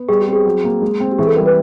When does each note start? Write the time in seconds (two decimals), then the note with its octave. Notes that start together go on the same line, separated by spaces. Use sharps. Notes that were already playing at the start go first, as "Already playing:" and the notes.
Already playing: B3
0.09 G3 G#4
0.22 G4
0.27 C4
0.33 G#4
0.46 F#3
0.64 A#3
0.82 G#3
1.00 C4
1.11 G4
1.19 E3 G#4
1.27 A4
1.36 G3 A#4
1.46 B4